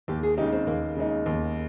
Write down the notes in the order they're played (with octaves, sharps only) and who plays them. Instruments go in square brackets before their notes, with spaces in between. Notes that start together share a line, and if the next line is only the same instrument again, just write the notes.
[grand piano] D#2 [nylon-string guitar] G4
[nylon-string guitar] G#4
[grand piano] C#3 G#3 D#4 [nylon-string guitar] G4
[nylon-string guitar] C4
[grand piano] D#2 [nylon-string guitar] A#3
[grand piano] C#3 G#3 D#4
D#2